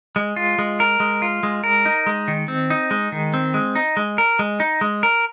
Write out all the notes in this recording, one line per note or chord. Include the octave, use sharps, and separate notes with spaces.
G#3
F4
G#3
A#4
G#3
F4
G#3
A#4
D#4
G#3
D#3
C4
D#4
G#3
D#3
C4
G#3
D#4
G#3
A#4
G#3
D#4
G#3
A#4